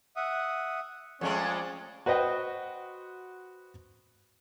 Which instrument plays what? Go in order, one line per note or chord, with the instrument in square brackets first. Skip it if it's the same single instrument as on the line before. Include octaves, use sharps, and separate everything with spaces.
[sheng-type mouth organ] E5 F#5 D#6
[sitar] F2 G#3 A3 [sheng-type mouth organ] C#4 C#5 D5
[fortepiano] F#4 B4 C5 D#5 G5